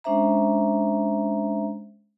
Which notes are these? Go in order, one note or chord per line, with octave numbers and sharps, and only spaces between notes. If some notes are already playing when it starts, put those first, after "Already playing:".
G#3 C#4 D4 C5 E5 A#5